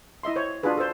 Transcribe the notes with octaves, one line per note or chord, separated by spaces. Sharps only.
E4 D#5 E5 C6
C5 C#5
D4 F4 F#4 G#4 B4
A4 C5